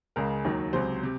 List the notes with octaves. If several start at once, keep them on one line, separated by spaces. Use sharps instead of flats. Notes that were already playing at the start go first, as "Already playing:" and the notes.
C#2 C#3 G#3 A#4
D#2 D#3 F#3
C#2 C3 F#3 C5
C3